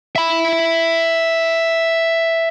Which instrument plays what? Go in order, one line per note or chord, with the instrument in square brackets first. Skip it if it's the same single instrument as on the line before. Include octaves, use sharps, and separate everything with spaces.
[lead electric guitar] E5 B5